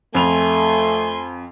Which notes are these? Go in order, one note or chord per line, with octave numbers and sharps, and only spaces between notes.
F2 A3 G#5 C6 F7